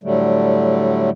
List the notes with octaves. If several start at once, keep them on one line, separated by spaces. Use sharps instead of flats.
A2 D3 F#3 G3 A3